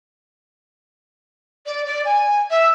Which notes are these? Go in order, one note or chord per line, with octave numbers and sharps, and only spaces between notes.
D5
D5
G#5
E5